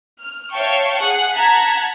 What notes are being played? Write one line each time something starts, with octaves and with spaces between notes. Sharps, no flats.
F6
C#5 E5 F5 G5 A5 C#6
G#4 F#5
F#5 A5 A#5 G#6 B6